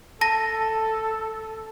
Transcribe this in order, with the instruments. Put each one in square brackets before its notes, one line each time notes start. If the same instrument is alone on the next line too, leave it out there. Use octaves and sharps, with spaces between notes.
[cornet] A4 [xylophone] A5 A#6